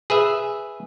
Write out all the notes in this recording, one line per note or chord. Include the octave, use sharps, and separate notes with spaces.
G#4 B4 E5